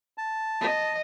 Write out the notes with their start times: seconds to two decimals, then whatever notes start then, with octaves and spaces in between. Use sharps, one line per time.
0.18 A5
0.61 D#5